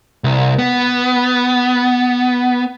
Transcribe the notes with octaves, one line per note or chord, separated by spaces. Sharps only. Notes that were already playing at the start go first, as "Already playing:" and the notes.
C2
B3